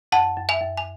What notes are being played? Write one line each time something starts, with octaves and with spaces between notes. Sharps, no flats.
F#2 F#5 A5
F#2
E5 G#5
F#2
G#5